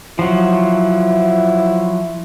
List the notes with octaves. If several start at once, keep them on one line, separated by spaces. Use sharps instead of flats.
F3 F#3 E4